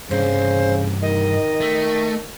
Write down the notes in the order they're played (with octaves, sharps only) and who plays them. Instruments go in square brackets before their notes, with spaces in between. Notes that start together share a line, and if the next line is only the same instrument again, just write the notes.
[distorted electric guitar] C2 G2 [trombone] C#3 [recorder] C5
[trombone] D#3 [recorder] D#5
[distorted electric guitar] A3